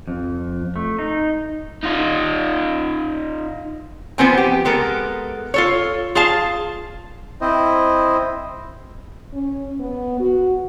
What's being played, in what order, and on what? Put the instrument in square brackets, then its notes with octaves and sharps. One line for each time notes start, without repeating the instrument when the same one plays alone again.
[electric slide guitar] F2
A3
D#4
[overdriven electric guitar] D#4 F4
[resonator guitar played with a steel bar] F3 B3 C4 G#5
G4
G#3 B3 A4 A#4
F4 A4 C#5
F4 G#4 F5 A5
[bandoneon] C4 E4 C5 D#5
[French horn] C#4
B3
F#4